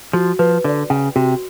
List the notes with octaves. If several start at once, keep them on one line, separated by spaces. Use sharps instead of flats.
F3 F#4
F3 B4
D3 D5
C#3 G5
C3 F#4